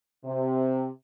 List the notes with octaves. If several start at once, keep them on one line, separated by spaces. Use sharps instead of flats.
C3